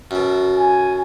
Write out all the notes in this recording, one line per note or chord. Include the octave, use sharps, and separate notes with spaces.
F#2 B2
G#5